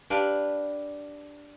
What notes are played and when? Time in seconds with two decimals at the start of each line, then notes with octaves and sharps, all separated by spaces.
0.10 D4 G4 B4 F5